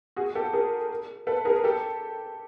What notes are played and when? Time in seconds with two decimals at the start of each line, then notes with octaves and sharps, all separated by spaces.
0.16 F#4 G#4
0.35 G4 A4
0.53 G#4 A#4
1.27 A4 B4
1.45 G#4 A#4
1.64 G4 A4